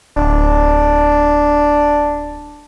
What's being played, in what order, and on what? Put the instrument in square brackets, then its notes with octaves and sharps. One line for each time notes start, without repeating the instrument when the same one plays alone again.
[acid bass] D1 [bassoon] D4